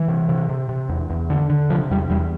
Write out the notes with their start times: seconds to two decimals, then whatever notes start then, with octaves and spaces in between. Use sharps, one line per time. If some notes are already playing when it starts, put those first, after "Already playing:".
Already playing: E3
0.08 C3
0.29 C3
0.49 C3
0.69 C3
0.89 E2
1.10 E2
1.30 D3
1.50 D3
1.70 C3 F3
1.91 E2 G3
2.10 E2 G3